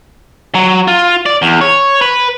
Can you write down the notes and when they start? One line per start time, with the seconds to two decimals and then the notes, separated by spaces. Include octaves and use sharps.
0.55 F#3
0.88 F4
1.26 D5
1.42 E2
1.61 C#5
2.01 B4